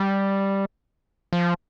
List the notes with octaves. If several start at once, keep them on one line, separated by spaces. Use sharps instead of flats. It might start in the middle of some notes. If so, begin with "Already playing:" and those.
Already playing: G3
F3